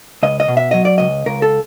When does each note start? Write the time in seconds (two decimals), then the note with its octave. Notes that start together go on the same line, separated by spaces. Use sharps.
0.23 C#2 D#5
0.40 D#5
0.48 B2
0.57 E5
0.71 F#3 D#5
0.85 D5
0.98 C#2 D#5
1.26 C#2 A#4
1.42 A4